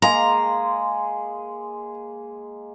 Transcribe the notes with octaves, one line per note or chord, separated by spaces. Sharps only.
G#3 A#3 G#4 A#5